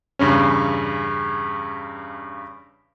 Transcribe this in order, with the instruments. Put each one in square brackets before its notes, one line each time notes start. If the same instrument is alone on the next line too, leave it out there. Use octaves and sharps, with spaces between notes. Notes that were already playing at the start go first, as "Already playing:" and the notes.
[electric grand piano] E2 G2 C#3 C#4